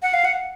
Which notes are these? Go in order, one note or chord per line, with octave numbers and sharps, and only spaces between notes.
F#5
F5
F#5